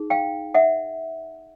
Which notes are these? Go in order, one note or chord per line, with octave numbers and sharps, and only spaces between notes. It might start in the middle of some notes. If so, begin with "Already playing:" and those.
Already playing: D#4 G#4
F5 G5
E5 F#5